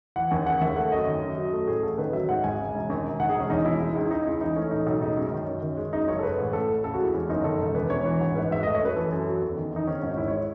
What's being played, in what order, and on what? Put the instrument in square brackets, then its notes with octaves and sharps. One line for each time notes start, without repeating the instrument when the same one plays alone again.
[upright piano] E3 F#5
D#2 G#5
C#3 F#5
D#2 E5
A3 F#5
F#2 D#5
D#3
F#2
F#3
A3
A2 G#4
A1 A4
D#3 B4
F#3 E5
G#2 F#5
G#1 G#5
C#3
E1
D#2
E1
D#3 F#5
G#4
E1 C#4
E2 D#4
E1 E4
G#3 E4
C#2 D#4
E4
C#3 D#4
C#2 E4
E3 D#4
A3 C#4
A2 D#4
B1 D#4
G#3 D#4
F#2 C#4
D#3
F#2
D#3
G#3
F#2 D#4
F#1 C#5
A4
G#3 B4
A1
A2 A4
A1
C#3 A4
G#3 F#4
E4
E2 C#4
F#1 D#4
D#3 A4
E1
E2 B4
E1 C#5
E3
G#1
G#2 B4
G#1 E5
A3 D#5
C#5
F#2 B4
E3 A4
F#2 A4
F#3
E2
D#3
E2 D#4
D#3 C#4
G#1 C#4
G#2 E4
C#5